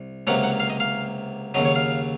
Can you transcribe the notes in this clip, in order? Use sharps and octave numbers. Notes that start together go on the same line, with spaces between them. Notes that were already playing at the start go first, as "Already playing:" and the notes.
Already playing: C2
C#2 C3 F#3 A#3 F#5
F#5
F5
D#5
F5
D#2 C#3 F#3 D#5
C#5
F5